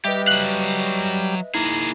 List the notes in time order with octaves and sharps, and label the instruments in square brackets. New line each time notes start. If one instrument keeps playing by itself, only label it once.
[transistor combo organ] G3 [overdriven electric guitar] G4 [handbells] B4 D#5 E5
[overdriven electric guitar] F#3 F5 [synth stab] F#6
[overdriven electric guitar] A#3 G#4 [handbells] D#4 E4